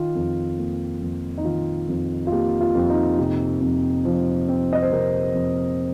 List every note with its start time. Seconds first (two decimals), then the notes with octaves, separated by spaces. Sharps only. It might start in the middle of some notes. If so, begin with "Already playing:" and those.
Already playing: D#3 F4
0.15 F2
0.59 A#3
1.02 F2
1.38 D#4
1.45 D#3 F4
1.89 F2
2.27 F4
2.32 A#3 G4
2.61 F4
2.75 F2
2.90 D#4
3.18 C3
3.61 F2
4.05 F3
4.49 C4
4.73 D#5
4.82 C5
4.92 C3 A#4
5.34 F2